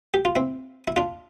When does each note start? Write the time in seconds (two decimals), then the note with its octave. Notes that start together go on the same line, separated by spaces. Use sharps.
0.14 G4
0.25 F4
0.36 C4 E4
0.88 E4
0.96 D4 F4